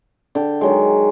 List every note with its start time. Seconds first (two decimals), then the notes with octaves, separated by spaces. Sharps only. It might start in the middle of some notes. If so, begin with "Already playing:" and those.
0.35 D3 G5
0.61 D#3 F#3 G#3